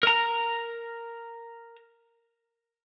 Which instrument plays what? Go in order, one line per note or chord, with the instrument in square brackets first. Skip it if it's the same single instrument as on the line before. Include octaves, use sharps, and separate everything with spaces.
[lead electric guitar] A#4 A#5